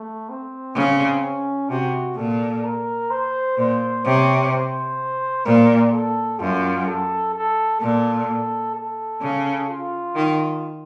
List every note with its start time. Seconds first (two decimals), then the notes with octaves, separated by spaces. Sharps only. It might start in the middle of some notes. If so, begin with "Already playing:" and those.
Already playing: A3
0.29 C4
0.75 C#3
1.23 C#4
1.70 C3 F#4
2.17 A#2 A4
2.64 A#4
3.11 C5
3.58 A#2 C5
4.05 C3 C#5
4.52 C5
5.46 A#2 A#4
5.93 A4
6.40 F#2 F4
6.87 A4
7.35 A4
7.81 A#2 A4
8.75 A4
9.22 C#3
9.69 F4
10.16 D#3